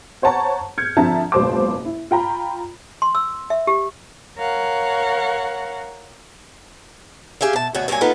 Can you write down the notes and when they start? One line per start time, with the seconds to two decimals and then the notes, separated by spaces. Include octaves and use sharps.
0.22 C5 C#5 F#5 A5 A#5 C#6
0.78 F6 G6 G#6 C#7
0.97 D3 F3 C4 E5 A5 A#5
1.32 F#1 C#2 B2 C5 A5 D6
1.85 E4
2.11 F4 G5 A#5 B5
3.02 C6
3.15 E6
3.50 E5
3.67 G4
4.38 A#4 C#5 F5 F#5
7.41 G4 G#4 E5 F5
7.53 B2 A5
7.75 D2 B2 B3 F#4 C#5 F#5
7.88 G2 F#3 A#3 C#5 G#5
8.01 A#3 B3 D#4 F4 A4